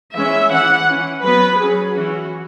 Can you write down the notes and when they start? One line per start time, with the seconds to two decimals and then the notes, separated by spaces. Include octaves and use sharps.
0.15 E3 G#3 C#4 E5
0.51 E3 C#4 F#5
0.87 E3 C#4
1.23 F#3 B3 B4
1.59 F#3 C#4 G#4
1.95 E3 C#4 F#4